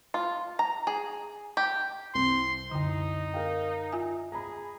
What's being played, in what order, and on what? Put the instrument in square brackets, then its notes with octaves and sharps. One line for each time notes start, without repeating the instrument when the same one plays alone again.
[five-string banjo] F4
A#5
G#4
G4
[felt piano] C2 C4 [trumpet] C6
[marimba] F#2 D3 [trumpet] D#4
[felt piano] A#4 F5 G5
[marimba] F4 E5 G#5
[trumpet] G#4 [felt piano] A#5 B5